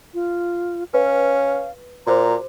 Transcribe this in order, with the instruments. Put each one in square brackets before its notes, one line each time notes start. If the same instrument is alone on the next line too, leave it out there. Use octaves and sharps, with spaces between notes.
[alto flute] F4
[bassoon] C#4 [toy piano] B4 [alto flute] F5
[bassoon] A#2 [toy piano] F#4 G#4 C5 [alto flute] A#5